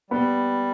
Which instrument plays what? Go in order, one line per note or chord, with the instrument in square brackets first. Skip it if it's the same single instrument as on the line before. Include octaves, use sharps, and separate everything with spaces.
[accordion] G3 [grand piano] B3